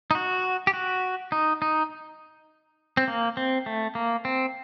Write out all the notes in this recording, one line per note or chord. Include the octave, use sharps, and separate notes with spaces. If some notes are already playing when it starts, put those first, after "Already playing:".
D#4
F#4
G4
F#4
D#4
D#4
C4
A#3
C4
A3
A#3
C4